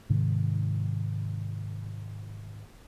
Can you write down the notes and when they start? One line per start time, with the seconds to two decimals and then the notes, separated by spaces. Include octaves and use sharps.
0.10 G#2 C3 D#3